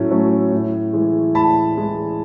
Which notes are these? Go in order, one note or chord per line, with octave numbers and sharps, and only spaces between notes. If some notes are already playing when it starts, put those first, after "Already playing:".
Already playing: A2 F#3 A3 C#4
F#3 A3 C#4
A2
E3 G#3
A2 A5 B5
E3 G#3